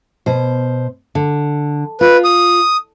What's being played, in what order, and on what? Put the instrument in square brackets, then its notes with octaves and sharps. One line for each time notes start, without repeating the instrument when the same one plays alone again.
[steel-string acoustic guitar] B2 C5
D3
[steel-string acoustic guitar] F4 [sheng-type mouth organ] B4
[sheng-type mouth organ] D#6